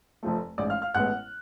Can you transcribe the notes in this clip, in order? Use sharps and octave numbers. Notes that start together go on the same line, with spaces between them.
F1 F2 F3 A3
A1 G#2 G#3 D5 D6
F5 F6
F5 F6
A1 A2 G#3 B3 F#5 F#6